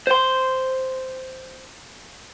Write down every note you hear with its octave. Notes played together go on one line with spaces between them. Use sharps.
C5 C6